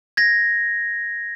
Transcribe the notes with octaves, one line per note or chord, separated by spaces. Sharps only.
G#6 A#6